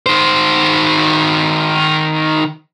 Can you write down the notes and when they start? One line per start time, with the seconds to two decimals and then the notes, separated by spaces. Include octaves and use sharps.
0.06 D#3 C5